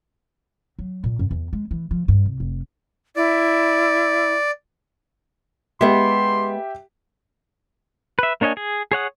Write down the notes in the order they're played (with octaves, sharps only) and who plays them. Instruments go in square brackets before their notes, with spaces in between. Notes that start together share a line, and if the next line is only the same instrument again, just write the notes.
[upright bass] F#3
A#2
F#2
E2
G#3
E3
F3
G2
C2
F1
[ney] E4 [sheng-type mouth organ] D5
[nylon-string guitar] G#3 B3 [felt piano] G4 E5 [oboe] C6
[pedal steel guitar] B4 E5
A#3 D4 C#5 D#5 G#5
G#4
G#4 C#5 F#5 D#6